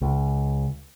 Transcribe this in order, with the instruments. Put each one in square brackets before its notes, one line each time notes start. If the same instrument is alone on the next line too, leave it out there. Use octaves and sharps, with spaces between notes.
[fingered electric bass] C#2